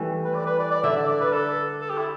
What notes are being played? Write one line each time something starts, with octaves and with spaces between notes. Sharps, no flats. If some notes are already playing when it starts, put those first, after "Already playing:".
Already playing: E3 G3 A3
B4
D5
B4
D5
D5
D3 E5
D5
D5
B4
A4
A4
G4
E4